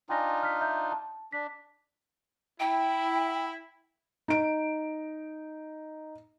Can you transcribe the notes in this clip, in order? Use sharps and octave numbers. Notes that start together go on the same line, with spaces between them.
D4 D#4 F4 G5 G#5 A#6
F6 B6
E5 A#5 G6
A5
D4 B6
E4 G5
D#4 D7